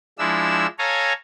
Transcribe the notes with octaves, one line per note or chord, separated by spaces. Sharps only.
F3 G#3 D4 E4 E6
A4 C#5 F5 G#5 A#5